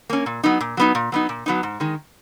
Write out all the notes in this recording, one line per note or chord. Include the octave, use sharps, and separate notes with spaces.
A#3 C#4
A#2
F#3 B3 D#4
A#2
F#3 B3 D#4
A#2
F#3 B3 D#4
A#2
F#3 B3 D#4
G#2
D#3 G#3